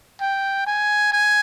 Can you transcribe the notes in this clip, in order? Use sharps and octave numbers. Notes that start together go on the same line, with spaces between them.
G5
G#5
G#5